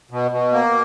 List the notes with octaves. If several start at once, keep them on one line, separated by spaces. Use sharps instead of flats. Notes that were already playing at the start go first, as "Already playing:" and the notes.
B2
B2
A#3